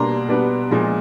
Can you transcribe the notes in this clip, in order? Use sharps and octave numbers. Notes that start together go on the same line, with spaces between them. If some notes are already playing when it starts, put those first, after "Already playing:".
Already playing: B2 G3 A#3 D4 A#5 C6
B2 G3 B3 D4
A#2 F3 G#3